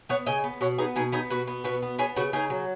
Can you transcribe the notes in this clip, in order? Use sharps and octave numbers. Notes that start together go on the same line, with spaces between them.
B3 C#5 F#5
C#3 D#5 G#5
B3
B2 C#5 F#5
B3 D#4 G#4
B2 D#4 G#4
B3 D#4 G#4
B2 F#4 B4
B3
B2 F#4 B4
B3
B3 G#4 C#5
C#3 F#4 B4
C#3 D#4 G#4
F#3